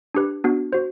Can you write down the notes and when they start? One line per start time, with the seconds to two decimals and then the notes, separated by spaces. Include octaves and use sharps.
0.15 D4 G4 B4
0.44 B3 D4 F#4
0.73 F#4 C5